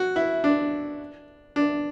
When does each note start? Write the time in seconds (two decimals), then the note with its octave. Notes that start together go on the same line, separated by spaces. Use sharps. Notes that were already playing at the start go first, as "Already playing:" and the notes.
Already playing: F#4
0.16 E4
0.44 D4
1.56 D4